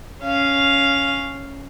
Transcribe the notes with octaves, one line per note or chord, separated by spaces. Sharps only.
C#4 F5